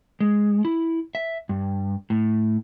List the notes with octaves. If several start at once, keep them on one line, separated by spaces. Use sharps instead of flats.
G#3
E4
E5
G2
A2